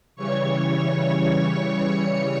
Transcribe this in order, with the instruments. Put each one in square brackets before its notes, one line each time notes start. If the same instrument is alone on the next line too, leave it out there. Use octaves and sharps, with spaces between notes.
[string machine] C#3 E3 G3 C#5 C#6